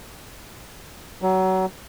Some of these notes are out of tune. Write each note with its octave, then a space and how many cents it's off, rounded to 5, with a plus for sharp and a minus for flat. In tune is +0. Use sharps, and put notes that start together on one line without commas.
F#3 +25